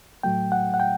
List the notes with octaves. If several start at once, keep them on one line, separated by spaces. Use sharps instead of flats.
A2 F#3 A3 G5
F#5
F#5
G5